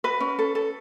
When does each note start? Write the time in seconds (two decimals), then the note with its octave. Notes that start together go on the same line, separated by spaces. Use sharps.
0.04 F#4 B4
0.20 C#4
0.39 A4
0.55 A4